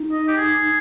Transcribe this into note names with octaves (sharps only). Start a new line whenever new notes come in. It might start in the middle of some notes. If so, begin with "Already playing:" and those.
Already playing: D#4
D#5
G4
G#4